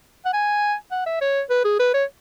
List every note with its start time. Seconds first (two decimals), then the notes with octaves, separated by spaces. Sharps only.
0.25 F#5
0.33 G#5
0.91 F#5
1.06 E5
1.21 C#5
1.50 B4
1.64 G#4
1.79 B4
1.94 C#5